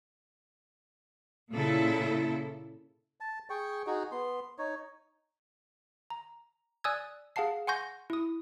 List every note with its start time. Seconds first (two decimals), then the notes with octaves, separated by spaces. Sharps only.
1.53 A#2 C#3 E4 A4
3.20 A5
3.50 G#4 G5 C#6
3.87 D#4 F#4 G#4
4.12 B3 C6
4.58 D#4 C#5
6.10 A#5
6.84 D5 G#5 D#6 E6 F#6 G#6
7.36 G#4 F5 F#5 A5 C7
7.67 F#5 G#5 C6 C#6 G6 A#6
8.10 E4 D#6